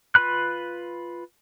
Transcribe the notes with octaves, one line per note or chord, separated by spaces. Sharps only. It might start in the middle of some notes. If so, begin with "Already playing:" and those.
F4 B4 B5 F#6